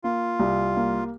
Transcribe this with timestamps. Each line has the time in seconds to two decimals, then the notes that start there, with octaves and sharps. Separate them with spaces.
0.04 A#3 F4
0.40 C2
0.77 A#3